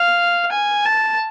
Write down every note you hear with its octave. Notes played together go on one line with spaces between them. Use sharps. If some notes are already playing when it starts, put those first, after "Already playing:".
Already playing: F5
G#5
A5